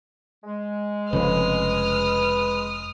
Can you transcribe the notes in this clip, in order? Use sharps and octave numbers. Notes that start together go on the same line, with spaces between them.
G#3
F1 F2 C#3 B4 D#6 F6